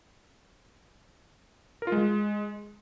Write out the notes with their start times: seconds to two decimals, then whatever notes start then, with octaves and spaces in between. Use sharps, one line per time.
1.82 A#4
1.87 F4
1.92 G#3